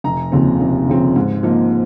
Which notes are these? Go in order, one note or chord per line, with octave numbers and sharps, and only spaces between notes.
F1 A#5
D#2 C#3 F3 C4
F1
D#2 C#3 F3 C4
G#2
F3 A#3 D#4